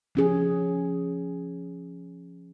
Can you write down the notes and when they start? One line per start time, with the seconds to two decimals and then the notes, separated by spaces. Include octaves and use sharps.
0.15 F3 C#4 G#4